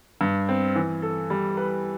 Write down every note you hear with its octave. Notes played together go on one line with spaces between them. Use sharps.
G2
C4
E3
A4
G3
B4